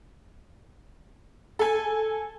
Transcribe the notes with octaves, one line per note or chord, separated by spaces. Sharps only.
A4 G#5